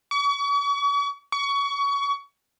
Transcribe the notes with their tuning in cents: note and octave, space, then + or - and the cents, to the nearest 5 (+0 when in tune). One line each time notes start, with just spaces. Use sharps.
C#6 +40
C#6 +25